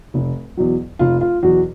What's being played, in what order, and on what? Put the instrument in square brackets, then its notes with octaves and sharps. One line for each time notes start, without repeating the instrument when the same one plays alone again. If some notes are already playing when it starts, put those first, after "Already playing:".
[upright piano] F1
E2 B2 F#3
F1 F4
F4
E2 B2 F#3 F#4